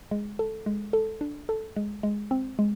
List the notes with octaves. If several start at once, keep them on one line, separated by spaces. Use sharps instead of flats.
G#3
A4
G#3
A4
D4
A4
G#3
G#3
C4
G#3